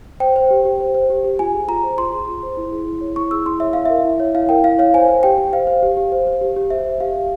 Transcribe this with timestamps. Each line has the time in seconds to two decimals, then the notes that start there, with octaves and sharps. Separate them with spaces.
0.20 C5 G5
0.36 C5
0.51 G4
0.65 G4
0.80 C5
0.95 C5
1.10 G4
1.24 G4
1.39 F4 G#5
1.54 G#4
1.68 F4 A#5
1.83 C5
1.98 F4 C6
2.13 G#4
2.28 F4
2.43 C5
2.57 E4
2.72 G#4
2.86 E4
3.01 C#5
3.16 E4 C#6
3.31 G#4 E6
3.46 E4 C6
3.60 C#5 E5
3.73 E4 F5
3.85 A#4 E5
4.05 E4
4.20 C#5
4.35 E4 F5
4.49 A#4 G5
4.64 E4 F5
4.79 C#5 F5
4.94 C5 G#5
5.08 C5
5.23 G4 G5
5.38 G4
5.53 C5 F5
5.67 C5
5.83 G4
5.97 G4
6.12 C5
6.27 C5
6.41 G4
6.56 G4
6.70 C5 E5
6.85 C5
7.00 G4 F5
7.16 G4